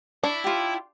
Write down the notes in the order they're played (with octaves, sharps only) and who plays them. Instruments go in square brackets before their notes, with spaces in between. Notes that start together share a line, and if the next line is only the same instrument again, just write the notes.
[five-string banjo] D4 [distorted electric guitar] E4 [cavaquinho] C#6
[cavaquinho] F4 G4